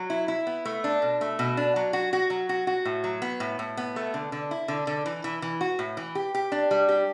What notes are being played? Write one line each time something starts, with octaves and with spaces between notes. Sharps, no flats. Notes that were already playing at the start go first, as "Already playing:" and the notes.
Already playing: F#3
E4
E4
B3
A3
D4
B2
A3
B2
D4
F#3
F#4
F#4
F#3
F#4
F#4
A2
F#3
B3
A2
A2
B3
A3
D3
D3
E4
D3
D3
E3
E3
E3
F#4
A2
E3
G4
G4
D4
G3
G4